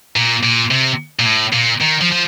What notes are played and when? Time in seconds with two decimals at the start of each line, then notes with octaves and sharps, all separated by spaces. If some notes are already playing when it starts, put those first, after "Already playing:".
0.16 A#2
0.43 A#2
0.71 C3
1.19 A#2
1.25 A2
1.52 A#2
1.81 D#3
2.01 F3
2.12 F3